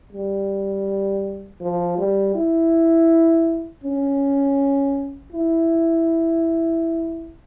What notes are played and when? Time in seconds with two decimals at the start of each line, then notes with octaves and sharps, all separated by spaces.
0.12 G3
1.61 F3
1.98 G3
2.35 E4
3.84 C#4
5.32 E4